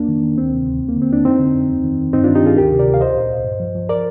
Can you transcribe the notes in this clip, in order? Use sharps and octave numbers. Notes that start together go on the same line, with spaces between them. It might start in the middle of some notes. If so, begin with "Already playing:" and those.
Already playing: F2 A#3 D4
D#3
D#3
D2 C4
C3
D2
D#2
A#3
D3
C4
D#2 D4
F2 C4 D#4
D3
F2
D#2
D#3
D#3
G2 C4 D#4
D#3 D4 F4
D#4 G4
D#3 F4 G#4
D2 G4 A#4
C3
A#4 D5
D2
F5
C2 C5 D#5
A#2
C2
G2
F3
F3
A#4 D5